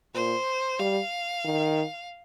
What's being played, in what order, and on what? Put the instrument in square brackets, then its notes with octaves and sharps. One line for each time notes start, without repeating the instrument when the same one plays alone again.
[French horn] A#2 [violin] C5
[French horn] G3 [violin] F5
[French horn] D#3